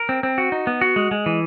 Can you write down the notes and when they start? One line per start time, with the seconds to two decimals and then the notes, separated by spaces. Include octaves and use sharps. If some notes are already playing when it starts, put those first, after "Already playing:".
Already playing: A#4
0.09 C4
0.23 C4
0.38 F#4
0.52 D#4
0.67 B3
0.81 F#4
0.96 G#3
1.11 G#3
1.26 E3